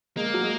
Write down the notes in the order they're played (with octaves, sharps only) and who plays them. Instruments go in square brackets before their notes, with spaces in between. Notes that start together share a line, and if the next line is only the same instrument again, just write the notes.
[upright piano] G#3 [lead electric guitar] A#3
[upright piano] F#3
G#3